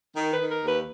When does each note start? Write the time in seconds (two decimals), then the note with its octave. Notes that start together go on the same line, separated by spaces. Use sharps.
0.16 D#3
0.33 B4
0.39 D#3
0.51 A#4
0.62 D#2
0.68 B4